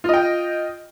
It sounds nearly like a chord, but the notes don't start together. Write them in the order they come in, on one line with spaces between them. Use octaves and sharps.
F4 D#5 G5